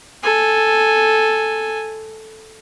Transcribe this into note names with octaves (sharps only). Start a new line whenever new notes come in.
A4 G#5